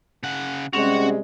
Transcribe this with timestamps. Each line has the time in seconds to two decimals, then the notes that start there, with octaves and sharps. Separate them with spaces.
0.23 C#3 F#5
0.73 C3 G3 G#3 C4 C#4 F#4